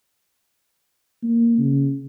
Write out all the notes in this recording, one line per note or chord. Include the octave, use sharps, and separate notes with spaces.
A#3
C#3